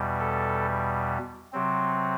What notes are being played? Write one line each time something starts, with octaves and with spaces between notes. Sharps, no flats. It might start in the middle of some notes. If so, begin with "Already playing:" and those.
Already playing: E2 B2 G3
A4
C3 F#3 C4